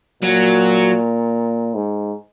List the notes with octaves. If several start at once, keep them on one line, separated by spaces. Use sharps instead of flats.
A#2 F#3
G#2